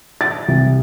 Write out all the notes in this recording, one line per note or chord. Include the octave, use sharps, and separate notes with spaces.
A6
C2